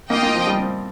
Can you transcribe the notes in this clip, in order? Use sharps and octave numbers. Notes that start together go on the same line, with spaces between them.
A#3 F4 D#5 G5
A#3
F3
G3
C4